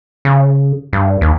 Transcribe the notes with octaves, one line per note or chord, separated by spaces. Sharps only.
C#3
G2
D#2